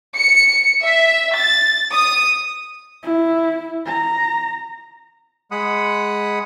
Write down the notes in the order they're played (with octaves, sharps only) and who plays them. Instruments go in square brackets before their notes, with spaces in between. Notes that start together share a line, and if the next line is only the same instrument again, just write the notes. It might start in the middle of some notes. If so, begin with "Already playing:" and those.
[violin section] C#7
E5
A6
D#6
[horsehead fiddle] E4
A#5
[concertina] G#3 F#5 B5 D#6